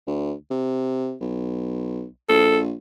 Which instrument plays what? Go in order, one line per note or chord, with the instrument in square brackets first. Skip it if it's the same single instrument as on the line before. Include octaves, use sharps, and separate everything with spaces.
[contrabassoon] D2
C3
B1
[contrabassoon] A#1 [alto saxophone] A4